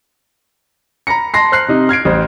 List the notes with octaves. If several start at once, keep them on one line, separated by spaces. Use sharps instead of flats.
A#5 B5 A#6 C#7
A5 C6 A#6 C7
C5 F6 F#6 C7
C3 D#4
F6 G#6 C7 D7
A1 C5